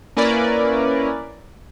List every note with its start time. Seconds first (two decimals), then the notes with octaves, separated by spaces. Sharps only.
0.17 A#3 C#4 E4 A#4 B4 D5